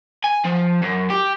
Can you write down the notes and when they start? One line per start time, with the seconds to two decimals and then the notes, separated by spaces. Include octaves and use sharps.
0.24 G#5
0.45 F3
0.82 F#2
1.10 G4